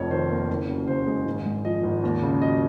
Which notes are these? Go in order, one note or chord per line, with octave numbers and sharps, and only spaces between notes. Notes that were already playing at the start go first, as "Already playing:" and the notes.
Already playing: F1 F2 C#5
D#3 C5
A#3
F#1
F#2
C#3 C5
G#3
G#1
G#2
F3 D#5
G#1
D#2
C#3
F#3 D#5